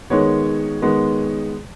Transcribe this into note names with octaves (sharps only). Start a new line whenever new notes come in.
D#3 G#3 B3 C#5
D#3 G#3 B3